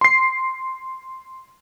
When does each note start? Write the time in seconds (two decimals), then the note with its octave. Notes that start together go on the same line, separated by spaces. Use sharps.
0.01 C6 C7